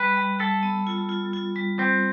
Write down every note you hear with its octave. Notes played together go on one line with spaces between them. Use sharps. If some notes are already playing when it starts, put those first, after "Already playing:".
Already playing: G3 B4
G3
G3 A4
B3
F4
F4
F4
G3
G3 C4